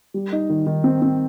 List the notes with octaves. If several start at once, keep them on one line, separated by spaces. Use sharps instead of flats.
G3
D#4
D#3
D#3
C4
C4